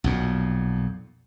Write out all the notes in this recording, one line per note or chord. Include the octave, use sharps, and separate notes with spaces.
B1 F2 A#2